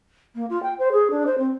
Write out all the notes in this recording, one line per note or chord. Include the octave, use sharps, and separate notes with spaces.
A#3
F4
G5
C5
G#4
D4
C5
C4